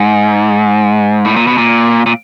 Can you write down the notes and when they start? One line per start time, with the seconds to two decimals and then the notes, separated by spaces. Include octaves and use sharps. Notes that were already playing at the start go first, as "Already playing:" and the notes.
Already playing: G#2
1.25 A2
1.36 A#2
1.47 B2
1.58 A#2
2.06 A#2